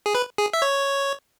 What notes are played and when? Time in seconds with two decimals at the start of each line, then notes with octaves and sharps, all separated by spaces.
0.06 G#4
0.15 B4
0.38 G#4
0.53 E5
0.62 C#5